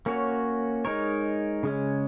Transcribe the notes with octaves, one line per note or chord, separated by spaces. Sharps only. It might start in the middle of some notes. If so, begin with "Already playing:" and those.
A#3 C#4 F#4 C#5
G#3 D#4 A#4 C#5
C#3 G#3 C#4